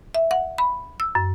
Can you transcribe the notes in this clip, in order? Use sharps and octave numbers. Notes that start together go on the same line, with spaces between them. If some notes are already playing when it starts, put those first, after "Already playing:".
E5
F#5
B5
E6
F#2